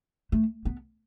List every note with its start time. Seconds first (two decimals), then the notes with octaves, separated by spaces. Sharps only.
0.32 A3
0.65 B3